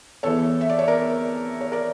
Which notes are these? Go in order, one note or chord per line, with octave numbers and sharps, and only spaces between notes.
E2 E3 A4 C#5
E5
D5
C#5
A#4 D5
C#5
A#4 D5